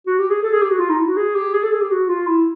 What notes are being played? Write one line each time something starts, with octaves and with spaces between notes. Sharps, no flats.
F#4
G4
G#4
A4
G#4
G4
F#4
F4
D#4
E4
F#4
G#4
G4
G#4
A4
G#4
G4
F#4
F4
E4